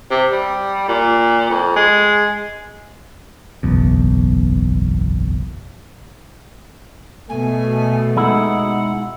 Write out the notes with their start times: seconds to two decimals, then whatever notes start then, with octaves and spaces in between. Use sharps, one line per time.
0.11 C3
0.32 G3
0.88 A#2
1.50 F2
1.76 G#3
3.63 F#1 B1 E2
7.29 B2 A3 G#5
8.16 G#3 D#4 E4 F#5